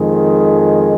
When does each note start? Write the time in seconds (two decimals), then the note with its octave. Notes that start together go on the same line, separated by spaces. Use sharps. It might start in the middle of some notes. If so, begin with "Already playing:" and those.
Already playing: F2 D#3 G#3